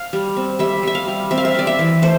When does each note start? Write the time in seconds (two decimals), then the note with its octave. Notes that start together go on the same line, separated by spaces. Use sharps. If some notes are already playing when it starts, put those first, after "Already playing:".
Already playing: F5
0.13 G3
0.37 C4
0.59 G3 E5
0.83 G3 E5
0.95 F5
1.08 G3
1.31 C4 E5
1.38 F5
1.45 E5
1.54 C4 D5
1.67 E5
1.79 E3
2.02 A3 C5